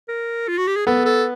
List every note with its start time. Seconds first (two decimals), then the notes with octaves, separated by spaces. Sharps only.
0.08 A#4
0.48 F4
0.58 F#4
0.67 G4
0.76 G#4
0.86 B3 A4
1.05 A4